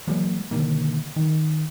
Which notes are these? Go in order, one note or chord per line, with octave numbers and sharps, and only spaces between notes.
E3 F#3 G#3 A#3
B2 D3 D#3 A#3
D#3